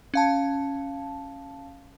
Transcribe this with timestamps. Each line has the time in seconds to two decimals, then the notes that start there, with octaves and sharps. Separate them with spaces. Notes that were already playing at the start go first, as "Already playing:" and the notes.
0.14 C#4 F5 A5